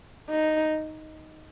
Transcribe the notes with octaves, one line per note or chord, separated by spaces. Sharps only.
D#4